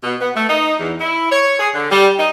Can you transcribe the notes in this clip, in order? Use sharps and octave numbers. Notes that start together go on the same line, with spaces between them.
B2
B3
A3
D#4
E2
E4
C#5
G#4
D3
G3
D#4